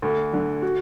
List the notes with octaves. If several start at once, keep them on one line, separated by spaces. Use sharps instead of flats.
D2
D3
F#4